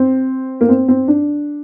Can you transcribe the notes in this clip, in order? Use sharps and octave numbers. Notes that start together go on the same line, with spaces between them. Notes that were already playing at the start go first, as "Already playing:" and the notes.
Already playing: C4
A#3
C4
C4
D4